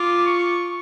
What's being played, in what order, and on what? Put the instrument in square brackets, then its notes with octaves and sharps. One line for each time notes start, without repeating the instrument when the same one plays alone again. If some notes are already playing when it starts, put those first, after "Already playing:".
Already playing: [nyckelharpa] F4 [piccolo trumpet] D6
[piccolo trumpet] C#6